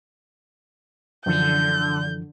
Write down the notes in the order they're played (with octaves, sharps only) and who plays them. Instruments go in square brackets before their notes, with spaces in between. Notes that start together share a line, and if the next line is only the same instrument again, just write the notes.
[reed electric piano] F#2 E3 F3 [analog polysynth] D3 [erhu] G6